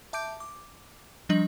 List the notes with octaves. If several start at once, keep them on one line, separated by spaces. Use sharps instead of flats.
E5 A5 D6 G6 D7
D6
F3 G3 D4 D#5 A#6 F#7